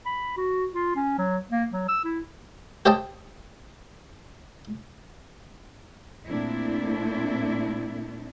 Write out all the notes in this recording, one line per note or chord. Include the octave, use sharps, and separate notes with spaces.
B5
F#4
F4
C#4
F#3
A#3
F#3
E6
E4
G4 C5 D#5 G5 A5
A#2 A3 C4 D4 E4